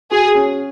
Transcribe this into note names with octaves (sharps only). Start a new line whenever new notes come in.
F#4 G#4
C#4